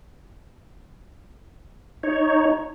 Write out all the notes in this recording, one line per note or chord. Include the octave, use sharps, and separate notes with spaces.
D#4 C#5